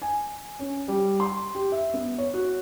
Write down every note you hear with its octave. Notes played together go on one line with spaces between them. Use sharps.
G#5
C#4
G3
C6
G4
E5
B3
C#5
F#4